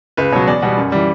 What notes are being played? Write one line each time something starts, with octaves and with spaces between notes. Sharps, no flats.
C#2 B4
B2 F#3 C#5
E2 D5
B2 G3 F#5
F#2
E3 G3